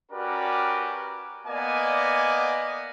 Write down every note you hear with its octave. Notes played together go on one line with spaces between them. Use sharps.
C#4 F#4 G4 A#4 B4 D5
A#3 B3 D5 D#5 G#5